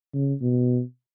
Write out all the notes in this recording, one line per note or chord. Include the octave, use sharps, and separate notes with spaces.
C#3
B2